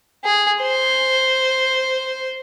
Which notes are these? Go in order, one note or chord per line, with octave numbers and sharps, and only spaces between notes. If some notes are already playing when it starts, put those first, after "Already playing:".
G#4
C5